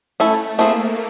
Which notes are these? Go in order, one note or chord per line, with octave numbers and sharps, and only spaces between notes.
A3 C#4 E4 A4
A3 A#3 C4 E4 G#4